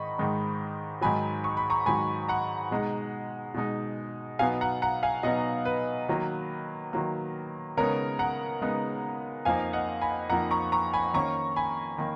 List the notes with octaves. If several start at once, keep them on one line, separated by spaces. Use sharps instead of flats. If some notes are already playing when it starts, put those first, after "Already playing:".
Already playing: G#2 D#3 D#5 B5 C#6
G#2 D#3 G#3 D#4
G#2 D#3 F#3 G#5 B5
C#6
B5
A#5 C#6
G#2 D#3 F#3 G#5 B5
F#5 A#5
B2 G#3 D#4
B2 G#3 D#4
B2 F#3 B3 D#4 F5 G#5
F#5 A#5
F#5 A#5
F5 G#5
B2 F#3 B3 D#4 D#5 F#5
B4
D#3 F#3 A#3
D#3 F#3 A#3
C#3 G#3 B3 D#4 A#4 C#5
F#5 A#5
C#3 G#3 B3 D#4
F2 F3 A#3 D#4 F5 G#5
D#5 F#5
G#5 B5
F2 F3 A#3 D#4 F#5 A#5
A#5 C#6
A#5 C#6
G#5 B5
D#3 A#3 C#4 A#5 C#6
G#5 B5
D#3 A#3